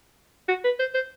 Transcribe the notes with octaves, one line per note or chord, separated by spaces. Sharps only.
F#4
B4
C5
C5